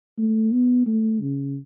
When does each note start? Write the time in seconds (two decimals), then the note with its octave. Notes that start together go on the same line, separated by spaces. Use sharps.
0.18 A3
0.52 B3
0.86 A3
1.21 C#3